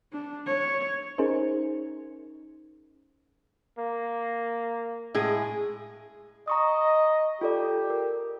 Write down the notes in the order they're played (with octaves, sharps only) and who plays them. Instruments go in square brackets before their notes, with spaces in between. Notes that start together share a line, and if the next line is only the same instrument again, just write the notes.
[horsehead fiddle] D4
C#5
[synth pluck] C#4 D#4 G#4 A#4 C5
[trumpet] A#3
[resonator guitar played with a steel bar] A2 G#3 G#4
[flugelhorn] D#5 [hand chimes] A#5 C#6 D#6
[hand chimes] F4 A4 D5 [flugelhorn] G4
[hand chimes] A#4